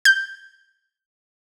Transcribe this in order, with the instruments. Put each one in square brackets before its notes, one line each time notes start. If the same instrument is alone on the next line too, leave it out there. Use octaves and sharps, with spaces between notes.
[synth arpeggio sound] G6